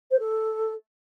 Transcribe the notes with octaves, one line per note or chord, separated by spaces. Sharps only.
C5
A4